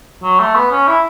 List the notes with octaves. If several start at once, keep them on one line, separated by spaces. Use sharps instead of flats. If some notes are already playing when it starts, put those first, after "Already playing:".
F#3
A3
B3
C#4
E4